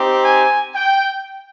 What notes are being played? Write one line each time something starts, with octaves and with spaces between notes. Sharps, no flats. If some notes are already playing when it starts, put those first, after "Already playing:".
Already playing: C4 D#4 G4
G#5
G5